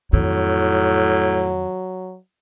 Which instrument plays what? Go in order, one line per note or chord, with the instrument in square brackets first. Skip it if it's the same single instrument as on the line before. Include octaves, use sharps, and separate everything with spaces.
[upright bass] F2 D#3 [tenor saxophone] A2 [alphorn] F#3